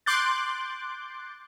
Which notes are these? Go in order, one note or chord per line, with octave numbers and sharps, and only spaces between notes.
C6 D6 F#6 G6 A6